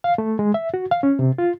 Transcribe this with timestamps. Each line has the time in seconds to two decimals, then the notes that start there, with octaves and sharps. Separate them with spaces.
0.04 F5
0.18 A3
0.39 G#3
0.54 E5
0.74 F#4
0.91 F5
1.03 C#4
1.19 C3
1.38 F4